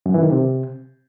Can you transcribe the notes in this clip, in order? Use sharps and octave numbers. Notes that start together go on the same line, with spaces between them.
F#2
E3
D#3
C3